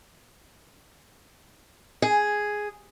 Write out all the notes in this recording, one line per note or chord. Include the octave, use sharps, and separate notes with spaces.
G#4